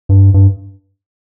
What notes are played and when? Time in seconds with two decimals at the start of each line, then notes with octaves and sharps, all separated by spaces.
0.09 G2
0.34 G2